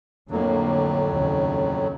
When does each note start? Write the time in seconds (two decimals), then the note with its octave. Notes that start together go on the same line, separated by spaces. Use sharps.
0.31 F2 A2 D3 F#3 A#3
1.10 D#2 C#3